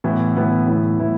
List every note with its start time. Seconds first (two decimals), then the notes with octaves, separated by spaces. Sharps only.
0.04 A2 E3 B3 E4
0.36 A2 E3 B3 E4
0.67 A2 E3 B3 E4
0.99 A2 E3 B3 E4